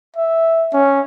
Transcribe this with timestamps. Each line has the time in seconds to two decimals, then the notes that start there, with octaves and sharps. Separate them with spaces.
0.16 E5
0.73 C#4